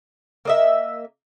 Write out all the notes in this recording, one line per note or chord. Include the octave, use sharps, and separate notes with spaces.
A#3 D#5 E5